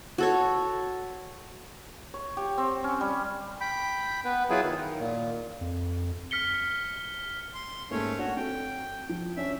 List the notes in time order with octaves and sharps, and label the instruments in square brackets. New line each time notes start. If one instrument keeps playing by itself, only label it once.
[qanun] F#4 A4 C#5
[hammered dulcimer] C#5
G4
C4
C#4
G3
[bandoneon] G5 B5
B3 B4
F#3 B3 E4 F4 G#4 B4
D#3
A#2
[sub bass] F2
[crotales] F6 B6 C#7 G7
[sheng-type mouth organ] C6
[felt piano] G#2 A#3 [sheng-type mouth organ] A3 C#4 C#5
[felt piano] D4 C#5 [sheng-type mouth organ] F#4
[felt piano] C4 F#4 A4 [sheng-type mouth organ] G5
[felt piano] F3
[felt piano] C#4 D4 [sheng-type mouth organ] E5